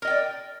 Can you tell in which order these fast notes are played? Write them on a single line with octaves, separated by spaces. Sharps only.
A#4 D#5 G5 D5